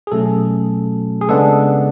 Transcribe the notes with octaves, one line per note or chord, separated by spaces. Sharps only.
G#4
B2 F#3 A3 C#4 A4
G#4
C#3 G#3 B3 D4 A4